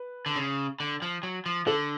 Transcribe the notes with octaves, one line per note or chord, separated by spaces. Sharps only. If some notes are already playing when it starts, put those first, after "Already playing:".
Already playing: B4
D3
C#3
D3
F3
F#3
F3
D3 A4